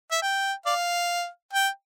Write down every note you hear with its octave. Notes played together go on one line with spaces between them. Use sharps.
E5
G5
D5 F5
G5